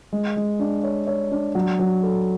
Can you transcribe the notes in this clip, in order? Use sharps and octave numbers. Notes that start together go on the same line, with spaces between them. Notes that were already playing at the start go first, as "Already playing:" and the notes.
G#3
G#3
D4
C#5
C#5
D4
F#3
F#3
A4